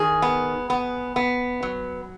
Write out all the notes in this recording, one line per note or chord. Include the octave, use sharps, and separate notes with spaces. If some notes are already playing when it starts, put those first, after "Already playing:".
Already playing: D#3 G#4
B3
B3
B3
F#3